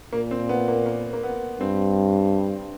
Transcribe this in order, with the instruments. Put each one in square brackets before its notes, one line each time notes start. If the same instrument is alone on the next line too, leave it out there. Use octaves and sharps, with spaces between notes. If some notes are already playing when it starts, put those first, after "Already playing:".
[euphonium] A#2 [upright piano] A#3
[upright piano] C4
B3
A#3
A#3
A#3
B3
[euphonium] G2 [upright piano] C4